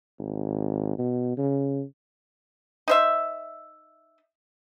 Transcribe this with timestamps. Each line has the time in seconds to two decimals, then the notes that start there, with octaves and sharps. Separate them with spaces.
0.19 G#1
0.98 B2
1.37 C#3
2.88 D#4 C5 E5